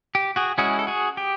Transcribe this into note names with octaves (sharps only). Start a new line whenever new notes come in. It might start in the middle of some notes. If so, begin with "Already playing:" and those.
G4
F#4 G#4
G#3 C#4 E4 F#4 G#4
A4
F#4 G#4
G4